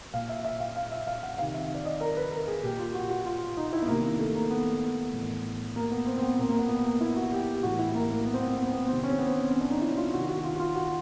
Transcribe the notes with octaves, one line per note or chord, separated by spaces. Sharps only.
A#2 F5
E5
E5
F5
F5
E5
F5
F#5
C3 D#3 F5
E5
D5
D#5
A#4
B4
A#4
G#4
A#2 G4
F4
F#4
F#4
F4
D#4
E4
B3
C3 D#3 A#3
A3
A#3
B3
A2 E3
A#3
B3
C4
C4
B3
A#2 A#3
A#3
B3
B3
A#3
E4
F#4
G4
G4
A2 E3 F#4
E4
A#3
A#3
B3
C4
B3
B3
C4
B3
C3 D#3 C4
C#4
C4
B3
C4
C#4
D4
D#4
E4
F4
C3 D#3 F#4
F#4
F4
F#4
F4
F#4